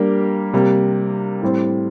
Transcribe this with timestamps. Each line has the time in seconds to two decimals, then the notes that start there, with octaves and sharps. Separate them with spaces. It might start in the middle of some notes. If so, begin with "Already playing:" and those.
Already playing: G3 A#3 D4 G4 A#4
0.53 C3 G3 A#3
1.42 A2 G3 C4